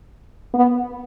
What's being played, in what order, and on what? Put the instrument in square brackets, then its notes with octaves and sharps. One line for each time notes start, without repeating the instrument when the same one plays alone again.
[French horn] B3